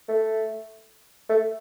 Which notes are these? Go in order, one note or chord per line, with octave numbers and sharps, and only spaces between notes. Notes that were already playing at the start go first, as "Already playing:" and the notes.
A3
A3